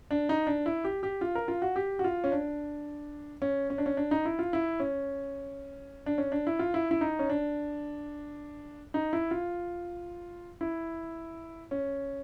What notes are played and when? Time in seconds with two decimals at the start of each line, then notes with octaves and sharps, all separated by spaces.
0.11 D4
0.29 D#4
0.47 D4
0.66 E4
0.84 G4
1.03 G4
1.21 F4
1.35 A#4
1.48 F4
1.62 F#4
1.76 G4
1.99 F#4
2.04 F4
2.24 C#4
2.32 D4
3.42 C#4
3.70 C#4
3.78 D4
3.86 C#4
3.97 D4
4.11 D#4
4.25 E4
4.39 F4
4.53 E4
4.80 C#4
6.06 D4
6.18 C#4
6.32 D4
6.47 E4
6.59 F4
6.74 E4
6.91 E4
7.01 D#4
7.19 C#4
7.30 D4
8.94 D#4
9.13 E4
9.31 F4
10.61 E4
11.71 C#4